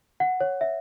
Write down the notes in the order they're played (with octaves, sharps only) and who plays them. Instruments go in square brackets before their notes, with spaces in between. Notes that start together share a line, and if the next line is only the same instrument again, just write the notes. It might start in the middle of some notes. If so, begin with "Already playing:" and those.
[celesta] F#5
C#5
E5